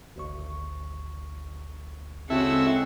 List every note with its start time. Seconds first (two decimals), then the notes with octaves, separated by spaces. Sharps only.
0.16 G#1 D2 C#6
2.30 C#3 G#3 C4 E4 F#4 A4 E5